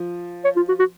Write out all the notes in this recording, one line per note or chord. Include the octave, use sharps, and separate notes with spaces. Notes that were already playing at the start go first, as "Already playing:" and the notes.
Already playing: F3
C#5
F4
F#4
F#4